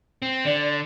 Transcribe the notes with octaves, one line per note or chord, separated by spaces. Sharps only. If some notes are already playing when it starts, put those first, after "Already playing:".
C4
D3 D5